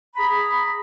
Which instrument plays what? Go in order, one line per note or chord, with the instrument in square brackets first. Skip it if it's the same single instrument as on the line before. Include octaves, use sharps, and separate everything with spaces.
[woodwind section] G#4 A#5 B5